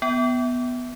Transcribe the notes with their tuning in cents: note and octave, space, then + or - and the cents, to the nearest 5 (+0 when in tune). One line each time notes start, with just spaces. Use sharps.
B3 +0 G5 -25